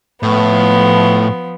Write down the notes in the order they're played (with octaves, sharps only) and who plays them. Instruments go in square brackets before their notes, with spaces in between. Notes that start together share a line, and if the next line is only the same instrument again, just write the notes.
[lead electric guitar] A2 [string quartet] F3 B3